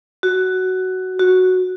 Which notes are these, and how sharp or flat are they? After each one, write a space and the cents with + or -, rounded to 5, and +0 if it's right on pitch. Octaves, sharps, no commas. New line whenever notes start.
F#4 +10
F#4 +0